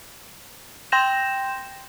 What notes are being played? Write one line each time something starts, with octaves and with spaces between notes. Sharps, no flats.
G5 C6 G6 A#6 E7